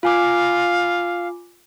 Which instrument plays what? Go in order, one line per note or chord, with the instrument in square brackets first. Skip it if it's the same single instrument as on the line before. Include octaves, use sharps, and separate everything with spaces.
[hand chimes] F4 G#5 D6 [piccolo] F5